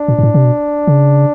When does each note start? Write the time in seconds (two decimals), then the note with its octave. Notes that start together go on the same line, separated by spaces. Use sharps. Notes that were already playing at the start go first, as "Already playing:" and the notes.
Already playing: D4
0.08 A#2
0.19 G#2
0.23 A2
0.34 C3
0.45 B2
0.87 C#3